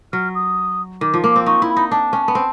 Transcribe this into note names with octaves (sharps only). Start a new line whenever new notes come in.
F#3 F6
D#6
D#3 D6
F3
A#3 D6
C4
D#4 C#6
E4
B5
D#4
D4 A5
C#4
B3
C4